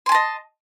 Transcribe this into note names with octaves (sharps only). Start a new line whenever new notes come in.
D#5 G#5 A5 C6